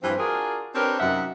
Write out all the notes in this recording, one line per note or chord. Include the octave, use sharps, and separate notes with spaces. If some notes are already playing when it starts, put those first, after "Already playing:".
G2 E3 F3 C4
D4 F4 F#4 G#4 A#4
C4 D4 G4 A#4 B4 C#5
F#2 C3 D#4 E5 F#5